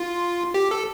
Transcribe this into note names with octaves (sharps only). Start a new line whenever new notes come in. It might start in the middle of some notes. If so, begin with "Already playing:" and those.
Already playing: F4
G4
A4